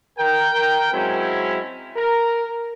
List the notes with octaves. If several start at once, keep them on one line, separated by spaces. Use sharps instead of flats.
A#4 G5
F#3 G#3 C4 C#4 E4
A#4